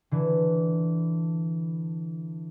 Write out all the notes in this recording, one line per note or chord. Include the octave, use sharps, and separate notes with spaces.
D3 E3